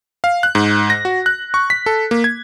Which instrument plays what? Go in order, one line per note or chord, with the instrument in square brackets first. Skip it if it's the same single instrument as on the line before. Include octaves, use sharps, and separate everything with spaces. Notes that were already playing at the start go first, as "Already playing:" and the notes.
[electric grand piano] F5
F#6
G#2
A#6
F#4
F#6
C#6
B6
A4
A#3
G#6